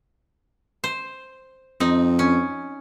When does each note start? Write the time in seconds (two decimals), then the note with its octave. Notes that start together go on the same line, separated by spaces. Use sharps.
0.84 C5
1.80 F2 C4 D#4
2.19 C#4